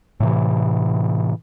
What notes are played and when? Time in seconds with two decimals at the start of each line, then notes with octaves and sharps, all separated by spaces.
0.20 A2 C3 E3